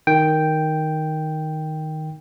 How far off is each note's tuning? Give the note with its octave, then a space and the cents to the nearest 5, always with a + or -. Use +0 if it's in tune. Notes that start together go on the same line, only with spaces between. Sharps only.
D#3 +0 G5 +0